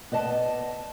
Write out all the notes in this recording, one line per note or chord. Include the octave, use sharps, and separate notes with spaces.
B3 D5 D#5 A5